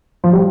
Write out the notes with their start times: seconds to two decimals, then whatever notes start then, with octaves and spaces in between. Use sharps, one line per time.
0.24 F3
0.33 G3